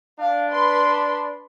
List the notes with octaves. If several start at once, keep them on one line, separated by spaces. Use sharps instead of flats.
D4 F5
B4 B5 C6